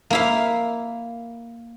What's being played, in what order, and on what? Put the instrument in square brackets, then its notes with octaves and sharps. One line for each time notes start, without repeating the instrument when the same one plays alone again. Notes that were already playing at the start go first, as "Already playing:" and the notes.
[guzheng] A#3 E4 F5